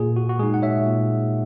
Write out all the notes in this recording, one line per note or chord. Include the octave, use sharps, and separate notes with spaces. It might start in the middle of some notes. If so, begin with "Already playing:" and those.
Already playing: A#2 G#4
F#4
F#4
G#3 D#4 G#4
F#5
C#5 E5
A#2